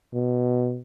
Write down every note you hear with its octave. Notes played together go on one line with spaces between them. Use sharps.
B2